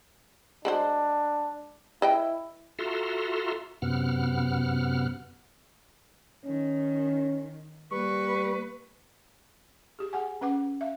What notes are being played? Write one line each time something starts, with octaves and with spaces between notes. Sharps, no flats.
G#3 D4 F#4 C5
E4 B4 D#5 G5
F4 F#4 A4 E5 A#5 C6
F#2 C3 B3 F#5 F6
D#3 C#4
G3 A#3 B4 C#6
G4 G#4
G#4 F#5 G#5
C#4 B4 F#5 D6
E5 F5